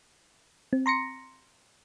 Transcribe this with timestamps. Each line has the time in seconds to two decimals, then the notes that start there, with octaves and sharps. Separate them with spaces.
0.73 C4
0.86 A#5 C6 A#6 C#7